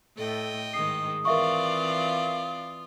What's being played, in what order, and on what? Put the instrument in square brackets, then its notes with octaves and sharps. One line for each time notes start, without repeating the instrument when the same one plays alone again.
[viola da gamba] A2 [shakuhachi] A4 [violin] D#5 G5
[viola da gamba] G#2 D#3 G#3 [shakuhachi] D#6 [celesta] C7
[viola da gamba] E3 C4 D5 [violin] F4 F5 [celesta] A#4 E5 C#6